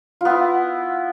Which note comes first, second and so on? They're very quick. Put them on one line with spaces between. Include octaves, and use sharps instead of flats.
F4 B3 E4